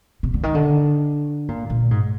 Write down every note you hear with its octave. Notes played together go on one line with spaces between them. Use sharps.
C3
D3
D#3
D3
A#2
A#2
G#2